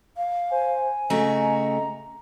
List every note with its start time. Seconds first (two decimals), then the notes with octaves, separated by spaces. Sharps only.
0.17 F5
0.51 C5 G#5
1.10 C#3 A3 F#4 D#5 A#5